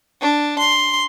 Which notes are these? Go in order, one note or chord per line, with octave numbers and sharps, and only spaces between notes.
D4
C6